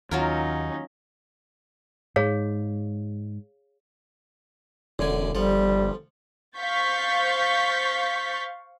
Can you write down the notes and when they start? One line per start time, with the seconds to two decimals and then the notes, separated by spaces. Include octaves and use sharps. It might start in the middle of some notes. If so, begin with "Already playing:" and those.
0.11 D#2 F#3 C#4 D#4 F4 A#4
2.16 G#2 G#4 C#5 F5
4.99 E1 F#2 D3 G#5
5.35 G1 F3 G3 A4
6.57 C5 F5 C#6 G6 A6 B6